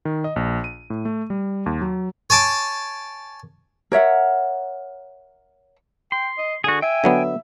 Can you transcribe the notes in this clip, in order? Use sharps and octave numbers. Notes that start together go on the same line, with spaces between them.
D#3
D#5
A#1
D#7
A2
A3
G3
D#2
F#3
C#5 G#5 A5 D6
A#4 C#5 E5 F#5
G5 C6
D#5
D3 F#4 G#4
E5 G5 G#5
D3 F#3 B3